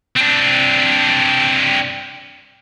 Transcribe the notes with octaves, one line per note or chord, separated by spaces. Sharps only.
C4 D4